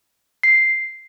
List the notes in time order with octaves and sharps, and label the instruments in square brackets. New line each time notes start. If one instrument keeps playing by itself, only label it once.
[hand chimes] C7